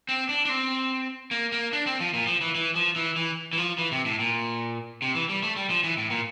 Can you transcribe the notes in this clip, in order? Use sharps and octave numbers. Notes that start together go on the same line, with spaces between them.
C4
D4
D4
C4
A#3
A#3
D4
C4
F3
A#2
F3
E3
E3
F3
E3
E3
E3
F3
E3
C3
A2
A#2
C3
E3
G3
A3
G3
F3
E3
A2
A#2